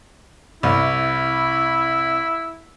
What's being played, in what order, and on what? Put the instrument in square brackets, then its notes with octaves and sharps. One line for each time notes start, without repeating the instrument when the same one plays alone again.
[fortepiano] C2 [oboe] E4